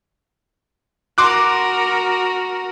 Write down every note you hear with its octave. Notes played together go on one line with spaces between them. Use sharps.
F#4 A#4 C6 D6 F#6